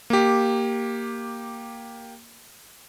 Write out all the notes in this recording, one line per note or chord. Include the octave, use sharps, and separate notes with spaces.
A#3 G4